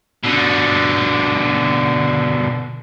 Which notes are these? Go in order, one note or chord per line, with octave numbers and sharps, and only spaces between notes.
B2 D3